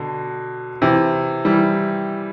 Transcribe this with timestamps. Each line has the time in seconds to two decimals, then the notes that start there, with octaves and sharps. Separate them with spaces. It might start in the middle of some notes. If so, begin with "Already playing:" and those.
Already playing: B2 D3
0.82 C3 E3
1.45 E3 G3